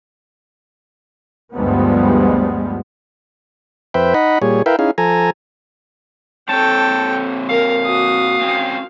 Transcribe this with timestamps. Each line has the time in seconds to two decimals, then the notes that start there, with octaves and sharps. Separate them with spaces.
1.55 D2 G2 F3 G3 G#3 B3
3.94 F2 B4 C5 E5 G5
4.14 D#4 D#5 F#5 B5
4.42 A#2 G3 G#4 C#5
4.66 E4 A#4 B4 E5 F5 G5
4.79 C#4 D#4 E4 G#4 F5
4.98 F3 A4 G#5 A#5
6.49 A#2 C4 A4 C#5 G5 A5
7.49 A#4 F5
7.86 F#4 D#6
8.41 C4 C#4 F4